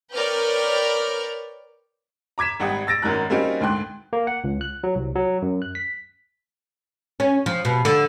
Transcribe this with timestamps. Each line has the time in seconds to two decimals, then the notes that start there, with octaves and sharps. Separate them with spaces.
0.14 A#4 B4 C#5 D5 G5 F6
2.38 A#5 D6 G#6 B6 E7
2.60 G#1 G3 F#5 G5 D#6
2.87 E6 A6 A#6 D7
3.02 G#1 F#2 D#3 F#3 A#5 F#6
3.30 G3 A#3 C4 C#4 D#4 F#4
3.61 D2 G#2 G5 C6 F#6
4.13 A#3
4.27 F#5
4.44 C#2
4.61 F#6
4.84 F#3
4.95 C2
5.15 F#3
5.42 F#2
5.62 F#6
5.75 B6
7.20 C#4
7.46 F3
7.65 B2
7.85 D3